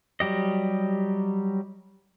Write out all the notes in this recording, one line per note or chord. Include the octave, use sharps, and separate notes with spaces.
F#3 G3 G4 D#5